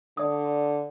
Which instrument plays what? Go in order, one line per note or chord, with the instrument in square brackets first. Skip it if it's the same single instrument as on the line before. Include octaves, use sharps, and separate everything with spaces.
[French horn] D3 [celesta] D5 D#6